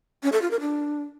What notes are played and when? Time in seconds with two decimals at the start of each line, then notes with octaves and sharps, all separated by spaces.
0.23 C#4
0.32 A4
0.42 F4
0.51 A#4
0.60 D4